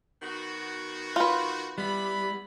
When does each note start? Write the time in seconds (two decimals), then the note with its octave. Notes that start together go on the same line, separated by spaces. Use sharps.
0.22 D#3 B3 F#4
1.16 F4 B4
1.78 G3 B3 E4 B5